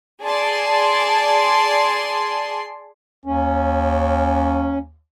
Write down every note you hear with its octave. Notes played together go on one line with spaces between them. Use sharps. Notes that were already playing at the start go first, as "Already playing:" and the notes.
G#4 D5 A5 C6
D#2 C#4